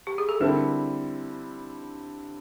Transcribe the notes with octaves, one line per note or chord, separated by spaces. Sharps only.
G4
G#4
A4
D3 G3 C4 E4 A#4